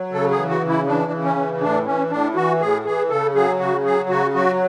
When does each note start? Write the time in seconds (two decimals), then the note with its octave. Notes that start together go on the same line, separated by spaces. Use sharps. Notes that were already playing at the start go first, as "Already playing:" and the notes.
Already playing: F#3
0.12 C#3 A4
0.31 G#4
0.37 E3
0.49 F#4
0.62 C#3
0.68 E4
0.87 E3 D4
1.12 C#3
1.24 C#4
1.36 E3
1.61 A2 D4
1.86 E3 C#4
2.11 A2 D4
2.35 E3 F#4
2.60 A2 G#4
2.85 E3 G#4
3.10 C#3 A4
3.35 F#3 G#4
3.59 C#3 F#4
3.85 F#3 G#4
4.09 C#3 F#4
4.34 F#3 F#4